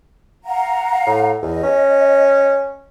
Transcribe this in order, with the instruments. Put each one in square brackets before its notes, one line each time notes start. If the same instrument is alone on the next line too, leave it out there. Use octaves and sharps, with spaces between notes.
[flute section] F5 F#5 A#5
[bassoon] A2
[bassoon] E2 [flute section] D#5
[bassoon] C#4